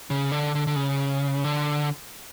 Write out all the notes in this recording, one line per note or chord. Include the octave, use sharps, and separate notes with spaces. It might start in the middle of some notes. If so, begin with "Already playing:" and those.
C#3
D3
D3
D3
C#3
D3